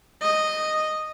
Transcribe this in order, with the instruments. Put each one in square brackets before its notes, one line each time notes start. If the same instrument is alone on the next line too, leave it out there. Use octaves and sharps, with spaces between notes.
[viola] D#5